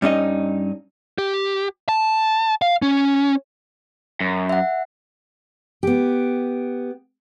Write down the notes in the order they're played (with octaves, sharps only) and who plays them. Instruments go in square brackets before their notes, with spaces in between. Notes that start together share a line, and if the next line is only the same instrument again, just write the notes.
[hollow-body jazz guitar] G2 C#4 D#4 D#5
[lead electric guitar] G4
A5
F5
C#4
[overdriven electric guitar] F#2
[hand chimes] E5 F#5
[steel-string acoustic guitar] B3 G4